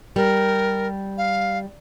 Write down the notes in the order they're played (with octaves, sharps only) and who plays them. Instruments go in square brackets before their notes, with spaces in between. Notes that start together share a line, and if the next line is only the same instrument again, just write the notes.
[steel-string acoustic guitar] G3 [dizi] A#4
[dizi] F5